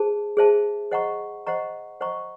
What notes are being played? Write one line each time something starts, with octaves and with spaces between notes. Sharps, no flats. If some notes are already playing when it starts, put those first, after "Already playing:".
Already playing: G#4 C5 A5
G#4 C5 E5 A5
C5 D#5 F#5 A#5 C#6
C5 D#5 F#5 A#5 C#6
C5 D#5 F#5 A#5 C#6